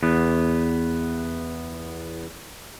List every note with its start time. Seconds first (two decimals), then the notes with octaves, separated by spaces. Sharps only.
0.03 E2 B3